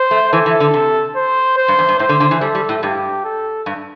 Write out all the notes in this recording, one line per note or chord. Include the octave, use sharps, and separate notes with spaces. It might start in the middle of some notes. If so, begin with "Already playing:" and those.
Already playing: C5
A3
E3 A4
E3
D3
C3
C5
C5
G2
E2
G2
A2 C5
D3
D3
E3
G3 A4
G3
A2
G2 G4
A4
G2